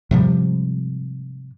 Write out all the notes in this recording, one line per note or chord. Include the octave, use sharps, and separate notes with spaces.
G#2 C3 F3 G3